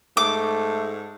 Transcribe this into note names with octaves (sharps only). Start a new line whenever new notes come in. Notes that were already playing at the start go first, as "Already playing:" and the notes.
G#2 A3 D6